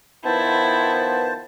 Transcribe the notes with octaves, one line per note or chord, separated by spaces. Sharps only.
D#3 F3 B3 E4 C5 A5